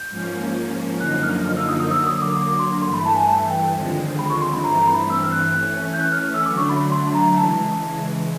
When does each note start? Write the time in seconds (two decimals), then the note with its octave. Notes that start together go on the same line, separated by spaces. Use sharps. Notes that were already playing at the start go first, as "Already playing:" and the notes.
Already playing: G6
0.09 G#2 F3 A#3 C#4
1.00 F#2 D3 F3 A#3 D#4 F#6
1.23 F6
1.46 F6
1.57 E6
1.69 D#6
1.80 D#6
1.91 D3 F#3 A#3 E6
2.07 D#6
2.22 D6
2.37 D6
2.59 C6
2.82 G2 E3 A3 C6
2.94 B5
3.06 A5
3.16 G#5
3.28 A5
3.50 G5
3.73 D#2 D3 F3 G#3 C4
4.19 B5
4.30 C#6
4.41 C6
4.53 B5
4.64 G2 E3 A3 C4 A#5
4.76 A#5
4.87 B5
4.99 B5
5.10 E6
5.23 F6
5.32 F#6
5.55 E3 A3 C#4
5.94 G6
6.01 F#6
6.12 F6
6.24 F6
6.34 E6
6.46 D3 F#3 A3 D4 D6
6.57 C#6
6.69 B5
6.91 C6
7.15 A#5
7.37 C#3 E3 G#3 A5